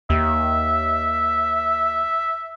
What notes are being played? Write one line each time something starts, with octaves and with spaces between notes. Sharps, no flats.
D#2 E5